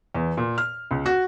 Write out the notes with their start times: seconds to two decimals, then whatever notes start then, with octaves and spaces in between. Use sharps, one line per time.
0.15 E2
0.37 A#2
0.58 F6
0.91 C#2
1.06 F#4